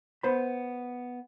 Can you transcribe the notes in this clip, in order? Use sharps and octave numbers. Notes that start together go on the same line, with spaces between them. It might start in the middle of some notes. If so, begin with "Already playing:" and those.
B3 C5 B5